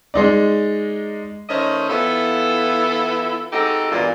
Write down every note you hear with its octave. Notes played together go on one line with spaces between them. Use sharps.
G#3 D#4 D5
D#3 A3 C#4 C5 D#5
E3 B3 E4 F4 A4
G#3 C4 D#4 F#4 G4 A4
E2 G2 A#2